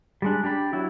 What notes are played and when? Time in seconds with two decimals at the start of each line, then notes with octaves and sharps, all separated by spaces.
0.22 G3 G#3 D4
0.44 D4 G4 D5 B5
0.73 F#3 E4